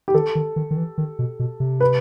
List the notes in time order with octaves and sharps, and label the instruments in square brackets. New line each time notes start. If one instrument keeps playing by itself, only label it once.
[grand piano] G4
[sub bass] D#3 [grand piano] A4
[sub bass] D#3
D#3
D#3
E3
D#3
B2
B2
C3
[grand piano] B4